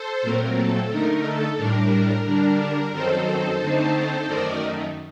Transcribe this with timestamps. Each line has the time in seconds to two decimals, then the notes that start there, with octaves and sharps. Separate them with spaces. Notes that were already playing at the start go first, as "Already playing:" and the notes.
Already playing: A4 C5
0.22 A#2 F#3 A3 C4 A#4
0.56 A4
0.89 D3 A3 D#4 A#4
1.23 A4
1.57 A2 G3 D4 A#4
2.24 D3 G3 D4
2.92 F#2 D#3 F#3 C4 D#4 A4 C5
3.60 D3 A3 C4 D#4
4.27 F#2 D#3 A3 D#4 A#4 D5